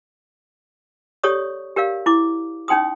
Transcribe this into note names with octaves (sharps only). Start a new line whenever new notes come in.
G4 A4 C#5 D5 C#6 D#6
G4 A#4 D5 F5
E4 D6
C#4 D#4 G5 C6 D#6